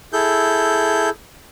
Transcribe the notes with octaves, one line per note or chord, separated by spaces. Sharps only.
E4 G#4 A4 G6